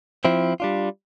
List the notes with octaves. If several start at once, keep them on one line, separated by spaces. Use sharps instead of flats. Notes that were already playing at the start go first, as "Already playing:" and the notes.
F3 C4 E4
G3 D4 F4